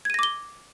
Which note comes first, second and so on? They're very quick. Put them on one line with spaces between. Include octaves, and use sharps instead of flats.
G#6 D#7 A#6 D6 G7